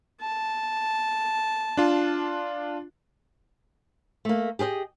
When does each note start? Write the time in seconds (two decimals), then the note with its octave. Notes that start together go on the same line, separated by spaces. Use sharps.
0.21 A5
1.77 D4 F4
4.25 A3 A#3
4.59 G4 G#4 B4 D#5